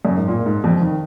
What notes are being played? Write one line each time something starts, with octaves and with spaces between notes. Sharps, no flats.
F#2
G#2
A#2
G#2
F2
D#3